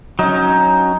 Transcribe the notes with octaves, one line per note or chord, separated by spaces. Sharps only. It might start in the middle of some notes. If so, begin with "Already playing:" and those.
F#3 C#4 D#4